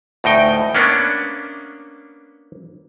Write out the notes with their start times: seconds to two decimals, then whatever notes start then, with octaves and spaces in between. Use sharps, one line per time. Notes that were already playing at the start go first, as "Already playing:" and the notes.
0.24 D2 A2 D#4 G5
0.75 A#3 B3 C#4 D4